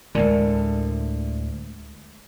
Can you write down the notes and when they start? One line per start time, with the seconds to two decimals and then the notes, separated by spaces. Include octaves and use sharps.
0.15 D2 A2 D3 G#3 A#4 D5